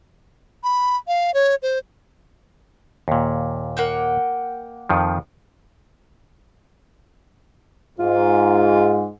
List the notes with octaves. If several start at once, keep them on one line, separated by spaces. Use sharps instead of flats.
B5
F5
C#5
C5
D#2 A#2
A#3 F#5 G5
F2 D#3 F3
G#2 F4